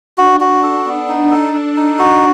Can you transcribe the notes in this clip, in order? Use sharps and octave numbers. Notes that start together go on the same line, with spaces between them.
D4 F#4
F#4
A4
B3
D#4
A4
D4 A4
D#4
F#4